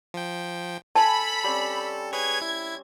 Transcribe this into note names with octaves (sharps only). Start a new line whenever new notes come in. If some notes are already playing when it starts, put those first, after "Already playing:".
F3 G5
A4 G#5 A5 B5
G3 C4 C#4
G#4 B4 C#5 G#6
E4